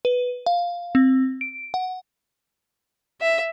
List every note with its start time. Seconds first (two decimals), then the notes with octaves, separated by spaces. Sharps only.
0.05 B4
0.46 F5
0.95 C4
1.41 D7
1.74 F#5
3.21 E5